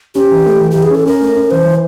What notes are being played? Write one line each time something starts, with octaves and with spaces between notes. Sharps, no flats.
C#4 G4
E3
A3
E3
E3 G4
G#4
C#4 A4
C#4 A#4
A3
C#4
E3 C5
E3